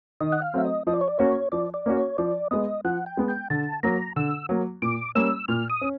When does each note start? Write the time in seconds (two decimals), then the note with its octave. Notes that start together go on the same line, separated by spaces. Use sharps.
0.21 D#3 D#5
0.32 F#5
0.42 F5
0.54 F#3 A3 C4 E5
0.65 D#5
0.87 F3 D#5
0.93 D5
1.01 C#5
1.08 D5
1.19 A#3 C#4 F#4 C#5
1.52 F3 D5
1.74 D5
1.86 A#3 C#4 F#4
1.97 C#5
2.18 F3 D5
2.51 G#3 B3 D#5
2.84 F3 F#5
3.06 G5
3.17 G#3 B3
3.28 G5
3.50 D3 A5
3.83 F#3 A#3 A#5
4.16 D3 E6
4.49 F#3 A#3
4.82 A#2 D6
5.15 G3 A#3 C#4 E6
5.48 A#2 F6
5.70 D#6
5.81 C#4